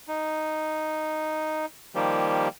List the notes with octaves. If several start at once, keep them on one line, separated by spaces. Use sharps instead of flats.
D#4
D#3 F3 G3 A#3 G4